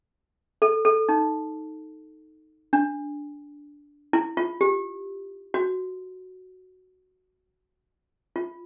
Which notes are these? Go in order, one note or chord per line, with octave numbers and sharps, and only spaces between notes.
A4
A4
D#4
D4
E4
F4
G4
F#4
F4